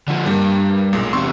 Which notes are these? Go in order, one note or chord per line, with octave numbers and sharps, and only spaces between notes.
D3 F3
G2 G3 A#3
B1 A#2 G#3
E2 C3 C6 C#6 E6